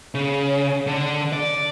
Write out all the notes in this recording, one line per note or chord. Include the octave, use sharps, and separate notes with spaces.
C#3
D3
D5